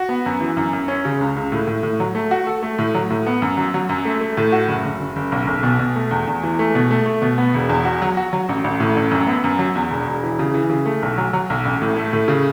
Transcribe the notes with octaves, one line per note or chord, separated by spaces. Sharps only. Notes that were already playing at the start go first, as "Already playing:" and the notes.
Already playing: F#4
B3
F#2
E3
F#2
F#2
C#4
C#3
C#2
C#2
A2
A2
A2
F#3
A3
F#4
A4
A3
A2
F#3
A2
B3
F#2
F#3
F#3
F#2
A3
A3
A2
F#4
F#1
F#1
F#1
F#1
B1
B1
B2
B2
A3
E2
E2
E3
A3
B2
A3
A3
B2
B3
E1
E2
F#4
F#3
F#4
F#3
A1
A1
A2
A1
F#2
B3
F#2
F#3
E2
E1
E1
E3
C#3
E3
C#3
A3
B1
F#3
F#3
B1
A1
A2
A3
A2
C#3